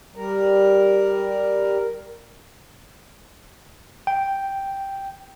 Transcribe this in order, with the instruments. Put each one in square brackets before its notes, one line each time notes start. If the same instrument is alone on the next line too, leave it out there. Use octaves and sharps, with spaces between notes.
[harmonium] G3 A#4
[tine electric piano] G5